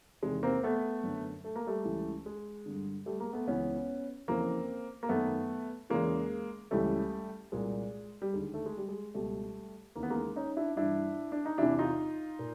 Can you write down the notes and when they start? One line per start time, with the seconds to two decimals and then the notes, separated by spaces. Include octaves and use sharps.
0.23 E2 C3 D#3 G#3
0.43 A#3 C4
0.63 A3 B3
1.04 F#2 D3
1.44 A3
1.56 A#3
1.67 G3 A3
1.85 C#2 C#3 E3
2.26 G#3
2.66 G2 D3
3.06 G3 A3
3.20 G#3 A#3
3.33 A3 B3
3.47 C#2 C#3 E3 B3 C#4
4.28 F2 C#3 E3 A#3 C4
5.03 A#3
5.09 F#2 D#3 A3 B3
5.90 E2 C#3 E3 G#3 A#3
6.71 C#2 C#3 E3 G3 A3
7.52 C2 A#2 G#3
8.22 G3
8.33 D#2 D3 G#3
8.54 A3
8.66 G#3
8.77 G3
8.88 G#3
9.14 C#2 B2 G3 A3
9.95 D#2 C#3 E3 A#3
10.03 B3
10.10 G#3 A#3
10.36 C#4 D#4
10.57 D4 E4
10.76 G2 E3 D4 E4
11.32 D4
11.45 D#4
11.58 E2 C3 E3 D4 E4
11.79 D#4 F4
12.39 A#2